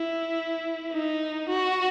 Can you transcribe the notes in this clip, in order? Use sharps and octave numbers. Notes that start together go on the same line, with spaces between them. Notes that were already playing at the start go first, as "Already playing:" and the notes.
Already playing: E4
D#4
F#4